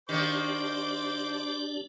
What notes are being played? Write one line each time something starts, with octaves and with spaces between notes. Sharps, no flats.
D#3 A#3 D4 G4 C5 D5 D6